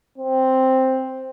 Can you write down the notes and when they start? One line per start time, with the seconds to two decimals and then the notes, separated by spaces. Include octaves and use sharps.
0.18 C4